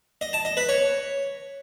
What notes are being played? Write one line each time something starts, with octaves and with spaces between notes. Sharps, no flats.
D#5
A5
D#5
B4
C#5